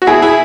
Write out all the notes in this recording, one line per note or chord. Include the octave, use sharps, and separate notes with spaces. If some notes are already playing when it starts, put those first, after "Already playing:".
F#4
B2 E4 G#4
E4 G#4